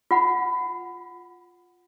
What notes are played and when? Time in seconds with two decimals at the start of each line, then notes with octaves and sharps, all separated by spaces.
0.11 F4 F#5 B5